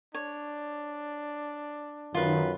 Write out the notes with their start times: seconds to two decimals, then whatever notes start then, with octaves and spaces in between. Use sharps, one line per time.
0.14 D4 C#5
2.14 F#2 D#3 F4 B4